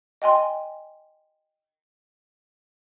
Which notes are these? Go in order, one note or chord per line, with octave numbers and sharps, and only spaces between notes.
D#5 G5 G#5 C6